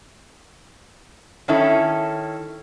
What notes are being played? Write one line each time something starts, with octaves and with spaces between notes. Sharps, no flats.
D#3 C#4 E4 A4